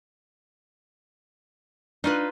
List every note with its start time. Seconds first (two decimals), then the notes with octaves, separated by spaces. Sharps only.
2.04 D4 D#4 F4 B4